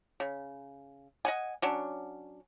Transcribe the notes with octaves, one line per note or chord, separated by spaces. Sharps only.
C#3
D#5 F#5 G#5
F#3 C#4 D4